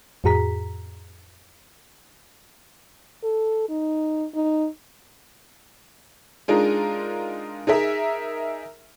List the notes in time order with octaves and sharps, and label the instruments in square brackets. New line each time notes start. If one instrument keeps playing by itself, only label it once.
[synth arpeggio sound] F2 A2 F#4 G#4 A#5 B6
[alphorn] A4
D#4
D#4
[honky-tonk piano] G#3 D4 D#4 F4 G#4 A#4
D#4 G#4 A#4 E5